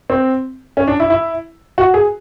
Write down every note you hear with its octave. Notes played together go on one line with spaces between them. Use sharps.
C4
C#4
D4
E4
E4
F#4
G#4